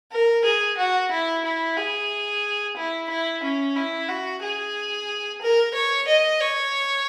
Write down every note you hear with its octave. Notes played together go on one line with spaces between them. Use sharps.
A#4
G#4
F#4
E4
E4
G#4
E4
E4
C#4
E4
F#4
G#4
A#4
C#5
D#5
C#5